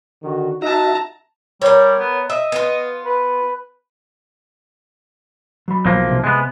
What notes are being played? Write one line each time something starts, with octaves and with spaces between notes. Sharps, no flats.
D3 D#3 F#4
D#4 F#4 E5 A5 A#5
G3 A#4 C#5
B3
D#5 E5
B3 F4
B4
F#3 B5
B1 F3 A#3
C3
G#3 B3